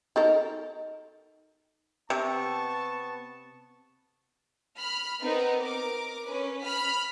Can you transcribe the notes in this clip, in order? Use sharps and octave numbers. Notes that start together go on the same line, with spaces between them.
D#4 A4 A#4
C3 B3 A5 C#6
B5 F6
B3 C4 D#4 A#4 B4
A#4 D6
C#4 B4
B5 F6 B6